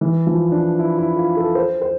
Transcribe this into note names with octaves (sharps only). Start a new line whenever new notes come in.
E3
F3
D4
E4
E4
F4
A4
C5
C5